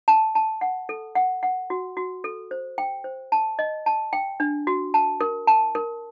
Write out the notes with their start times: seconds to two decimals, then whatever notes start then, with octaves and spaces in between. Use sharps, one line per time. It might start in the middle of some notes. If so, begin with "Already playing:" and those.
0.08 A5
0.35 A5
0.61 F#5
0.89 A4
1.15 F#5
1.43 F#5
1.70 F#4
1.97 F#4
2.24 A4
2.51 C5
2.78 G5
3.04 C5
3.32 A5
3.59 D#5
3.86 A5
4.13 G5
4.40 D4
4.67 F#4
4.94 A5
5.21 A#4
5.47 A5
5.75 A#4